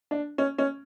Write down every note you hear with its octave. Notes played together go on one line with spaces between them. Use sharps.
D4
C#4
C#4